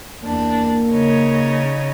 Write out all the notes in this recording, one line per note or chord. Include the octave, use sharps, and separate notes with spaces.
E2 A#3 D4
C#3 D#4 C#5